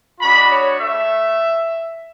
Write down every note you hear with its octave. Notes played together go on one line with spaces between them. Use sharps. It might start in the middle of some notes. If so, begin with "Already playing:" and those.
G#3 D4 F#4 B5
C#5
A3 E5